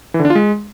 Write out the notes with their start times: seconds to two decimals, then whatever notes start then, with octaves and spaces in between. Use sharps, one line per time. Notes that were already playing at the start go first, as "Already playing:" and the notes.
0.14 E3
0.20 D3
0.25 D4
0.30 F4
0.35 G#3